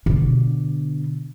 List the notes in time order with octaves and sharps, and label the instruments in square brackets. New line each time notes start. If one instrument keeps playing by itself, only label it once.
[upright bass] B2 D3